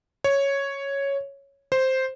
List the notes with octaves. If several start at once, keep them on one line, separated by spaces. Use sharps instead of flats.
C#5
C5